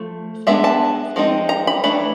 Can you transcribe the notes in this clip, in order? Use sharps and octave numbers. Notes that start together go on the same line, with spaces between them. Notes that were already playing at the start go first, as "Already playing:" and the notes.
Already playing: F3 A3
G#3 B3 D4 E5
A5
F3 G#3 C4 D#4
A#5
B5
E3 A3 D4 B5